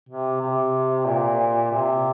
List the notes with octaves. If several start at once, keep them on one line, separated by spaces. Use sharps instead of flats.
C3
C3
A#2
C3